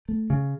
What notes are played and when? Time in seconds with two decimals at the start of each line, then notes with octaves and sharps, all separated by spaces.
0.09 A3
0.30 C#3